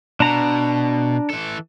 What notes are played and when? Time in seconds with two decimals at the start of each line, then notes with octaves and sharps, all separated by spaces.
0.20 B2 D4 A#5
1.30 E3 A4